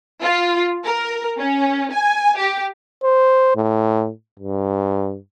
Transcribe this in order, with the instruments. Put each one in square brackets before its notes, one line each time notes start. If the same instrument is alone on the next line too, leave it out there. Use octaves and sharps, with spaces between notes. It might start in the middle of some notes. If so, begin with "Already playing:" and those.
[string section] F4
A#4
C#4
G#5
G4
[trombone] C5
A2
G2